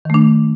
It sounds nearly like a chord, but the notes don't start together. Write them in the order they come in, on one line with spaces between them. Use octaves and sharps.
D#3 A3 D4